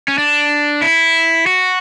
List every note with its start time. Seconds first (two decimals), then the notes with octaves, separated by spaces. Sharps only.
0.08 C#4
0.18 D4
0.82 E4
1.46 F#4